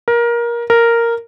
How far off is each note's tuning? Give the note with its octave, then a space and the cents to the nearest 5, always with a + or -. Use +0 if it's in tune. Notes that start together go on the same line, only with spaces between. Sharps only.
A#4 +20
A#4 -5